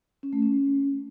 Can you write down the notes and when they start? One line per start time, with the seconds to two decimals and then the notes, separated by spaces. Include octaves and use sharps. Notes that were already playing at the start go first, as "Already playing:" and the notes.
0.23 C#4
0.33 A3
0.42 C#4